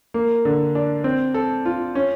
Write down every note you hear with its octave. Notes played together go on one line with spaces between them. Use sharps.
A#3
D3
D4
C4
A4
F4
C#4